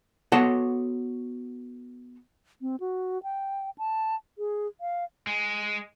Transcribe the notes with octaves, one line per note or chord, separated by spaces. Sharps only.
B3 F#4 A4 C#5 F#5 A5
C4
F#4
G5
A5
G#4
F5
G#3